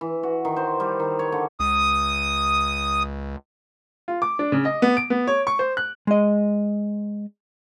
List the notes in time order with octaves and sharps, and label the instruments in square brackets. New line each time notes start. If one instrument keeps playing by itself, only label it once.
[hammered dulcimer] E3
F#4
D#3
C5
G3
D#3
C#5
D3
[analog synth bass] C#2 [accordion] D#6
[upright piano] F4
D6
D4
C#3
D#5
B3
D7
B3
C#5
C#6
C5
F#6
[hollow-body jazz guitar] G#3 D#5